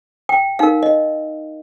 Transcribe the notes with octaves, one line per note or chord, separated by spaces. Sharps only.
G5
D#4 A#4 F5
D#5